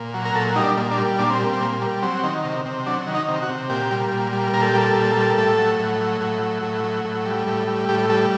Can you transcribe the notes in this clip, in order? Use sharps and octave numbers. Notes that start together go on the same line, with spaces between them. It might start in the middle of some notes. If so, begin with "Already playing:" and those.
Already playing: A#2
F#3
A#4
A#2 A4
G3 D#4
D4
A#2
D4
G3
A#2 D4
C4
G3
C4
A#2
G3
F#3 C4
D#3
C3
C3
F#3 D4
D#3
D#4
C3
F#4
C3
A#2 G4
G3
A#2
G3
A#2 A#4
A4
G4
G3 A4
A#2
G3
A2
F#3
A2
F#3
A2
F#3
A2
F#3
A2
G3
A2
G3
A2 G4
G3 A4